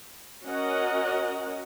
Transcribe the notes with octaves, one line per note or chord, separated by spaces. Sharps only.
C#4 F#4 A#4 D#5 F#5